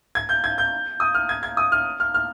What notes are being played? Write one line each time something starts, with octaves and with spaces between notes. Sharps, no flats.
G#6
G6
G#6
G6
D#6
F6
G#6
G#6
D#6
F6
F6
F6